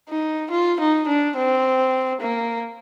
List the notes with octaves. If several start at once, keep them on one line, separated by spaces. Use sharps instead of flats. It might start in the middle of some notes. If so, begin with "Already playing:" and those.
D#4
F4
D#4
D4
C4
A#3